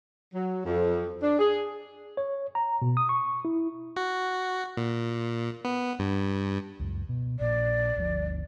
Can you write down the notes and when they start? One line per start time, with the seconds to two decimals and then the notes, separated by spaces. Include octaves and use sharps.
0.34 F#3
0.65 F2
1.21 D4
1.39 G#4
2.17 C#5
2.55 A#5
2.82 B2
2.97 D#6
3.09 C#6
3.45 E4
3.96 F#4
4.77 A#2
5.65 B3
5.99 G2
6.79 C#2 F#2
7.09 B2
7.40 A#1 A#2 D5
7.96 G1 D2 F3